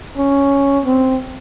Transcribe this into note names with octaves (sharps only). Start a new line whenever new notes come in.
C#4
C4